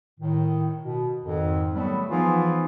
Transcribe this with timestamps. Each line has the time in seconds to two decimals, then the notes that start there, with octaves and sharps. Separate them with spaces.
0.19 A2 D#3
0.81 B2
1.22 F2 G#2 D#3
1.74 F#3 G3 A3 B3
2.10 E3 F3 B3 D#4 F4 G#4